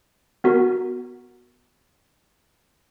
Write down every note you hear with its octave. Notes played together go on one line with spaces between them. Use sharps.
B3 F#4 A#4